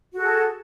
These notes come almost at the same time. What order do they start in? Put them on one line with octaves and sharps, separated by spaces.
F#4 A4 G#4 A5